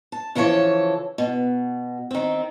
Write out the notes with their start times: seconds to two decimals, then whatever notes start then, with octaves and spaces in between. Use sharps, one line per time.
0.12 A5
0.35 C#3 E3 F3 A4 C#5
1.18 B2
2.11 D#3 C4